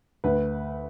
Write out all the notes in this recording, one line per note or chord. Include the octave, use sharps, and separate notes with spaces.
D2 B4